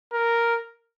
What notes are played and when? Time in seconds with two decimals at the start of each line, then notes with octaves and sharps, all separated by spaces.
0.13 A#4